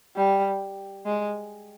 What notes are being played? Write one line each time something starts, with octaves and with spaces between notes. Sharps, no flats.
G3
G#3